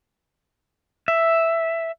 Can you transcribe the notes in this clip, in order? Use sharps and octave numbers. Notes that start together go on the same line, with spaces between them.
E5